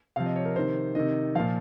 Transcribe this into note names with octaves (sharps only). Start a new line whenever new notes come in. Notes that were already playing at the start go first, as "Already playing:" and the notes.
C3 F3 F5
D#5
C#5
A#4
C3 D#3 C5
C3 D#3 D#5
A#2 F3 F5